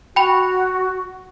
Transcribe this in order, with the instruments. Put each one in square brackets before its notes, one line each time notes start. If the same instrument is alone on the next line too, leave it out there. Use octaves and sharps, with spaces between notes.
[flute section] F#4 [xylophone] G5 B5